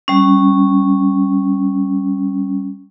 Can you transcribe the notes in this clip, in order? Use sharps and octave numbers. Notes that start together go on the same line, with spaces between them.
G3 C#4